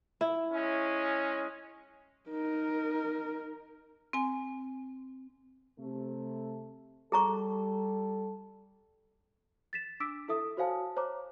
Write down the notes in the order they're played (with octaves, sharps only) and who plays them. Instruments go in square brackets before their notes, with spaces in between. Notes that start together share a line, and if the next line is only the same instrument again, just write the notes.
[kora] E4
[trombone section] G#3 C#4
[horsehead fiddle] D#4 A#4
[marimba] C4 G#5
[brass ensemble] C3 A3
[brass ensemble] G3 A4 [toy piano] G#4 A#5 C#6
[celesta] A6 B6 E7
D4 D6 E6 B6 D7
E4 A4 E5 D#6
F#4 C5 C#5 F5 G#5 A5
C5 C#5 A#5 D6